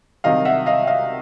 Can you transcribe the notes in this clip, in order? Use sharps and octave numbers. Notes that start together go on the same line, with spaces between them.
C2 C3 D#3 F#3 D#5 F5
E5 F#5
D#5 F5
D#5 F5